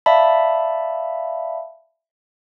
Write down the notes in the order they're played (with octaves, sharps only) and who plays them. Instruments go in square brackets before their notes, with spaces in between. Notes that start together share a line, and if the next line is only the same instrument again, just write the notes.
[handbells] D5 E5 F5 A5 B5